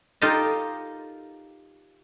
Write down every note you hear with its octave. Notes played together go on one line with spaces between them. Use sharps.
D#4 F4 G4 A4 A#4 D#5